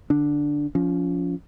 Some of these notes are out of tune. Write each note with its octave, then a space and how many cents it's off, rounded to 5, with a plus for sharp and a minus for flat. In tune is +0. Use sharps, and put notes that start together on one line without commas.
D3 +0 D4 +0
F3 +0 C#4 +35